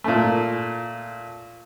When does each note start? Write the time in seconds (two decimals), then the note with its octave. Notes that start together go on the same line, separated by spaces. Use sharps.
0.04 A#2 A3